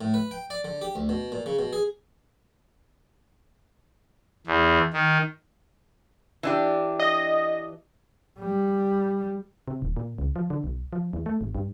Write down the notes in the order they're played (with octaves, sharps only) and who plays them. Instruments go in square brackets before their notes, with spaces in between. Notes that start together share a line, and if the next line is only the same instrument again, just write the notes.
[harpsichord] A2
B4
G5
D5
D3
G4
D2
B2
A#2
C#3
B2
G#4
[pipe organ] E2
D#3
[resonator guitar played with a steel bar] E3 D4 G4
[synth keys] D#5
[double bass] G3
[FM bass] C3
D#1
A#2
C#2
F3
D3
B1
F3
E2
A3
G#1
G2